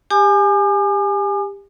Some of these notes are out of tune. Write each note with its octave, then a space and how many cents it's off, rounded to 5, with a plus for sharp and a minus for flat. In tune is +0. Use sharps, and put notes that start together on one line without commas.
G4 +25 G#5 +0 D6 +45